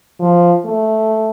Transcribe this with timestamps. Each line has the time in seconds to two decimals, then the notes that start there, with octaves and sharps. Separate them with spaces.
0.20 F3
0.65 A3